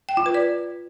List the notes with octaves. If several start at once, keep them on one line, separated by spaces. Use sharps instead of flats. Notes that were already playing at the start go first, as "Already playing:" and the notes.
G5
F4
B4
D5